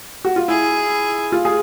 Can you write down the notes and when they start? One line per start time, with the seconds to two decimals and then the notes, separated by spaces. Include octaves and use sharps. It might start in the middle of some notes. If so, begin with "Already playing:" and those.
0.25 F#4
0.36 F4
0.48 E4 G#4
1.32 F4
1.45 G#4